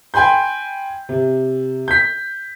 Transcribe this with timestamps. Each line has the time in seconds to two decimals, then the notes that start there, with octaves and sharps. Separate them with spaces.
0.14 G5 G#5 B5 C6 G6
1.09 C3
1.88 G6 B6